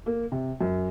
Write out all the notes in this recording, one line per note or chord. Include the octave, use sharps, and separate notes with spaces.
A#3
C3
F#2